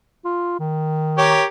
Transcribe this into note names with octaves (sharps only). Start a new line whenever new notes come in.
F4
D#3
G4 A#4 C#5